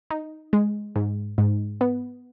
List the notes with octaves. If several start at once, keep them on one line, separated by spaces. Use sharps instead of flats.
D#4
G#3
G#2
G#2
B3